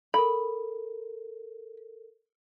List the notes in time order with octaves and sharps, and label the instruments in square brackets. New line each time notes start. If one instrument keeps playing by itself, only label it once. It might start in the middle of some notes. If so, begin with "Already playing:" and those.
[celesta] A4 A#4 [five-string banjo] B5